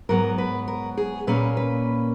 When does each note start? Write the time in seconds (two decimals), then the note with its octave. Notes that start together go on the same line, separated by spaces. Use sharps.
0.09 G#2 F#3 B3 A#4
0.38 B4
0.68 A#4
0.97 G#4
1.27 A#2 A#3 C#4 B4
1.57 B4